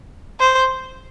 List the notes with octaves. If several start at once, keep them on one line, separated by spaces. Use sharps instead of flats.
C5